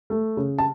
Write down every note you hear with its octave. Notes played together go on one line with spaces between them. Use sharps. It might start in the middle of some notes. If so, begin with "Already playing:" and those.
A3
C#3
A5